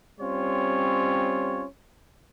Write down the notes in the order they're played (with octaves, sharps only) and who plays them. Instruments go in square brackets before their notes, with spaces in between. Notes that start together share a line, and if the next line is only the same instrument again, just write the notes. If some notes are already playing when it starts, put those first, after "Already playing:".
[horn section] G3 C4 C#4 F4 C#5